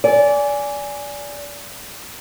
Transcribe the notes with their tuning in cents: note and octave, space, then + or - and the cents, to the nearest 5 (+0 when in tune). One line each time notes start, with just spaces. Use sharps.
D5 -25 G#5 +0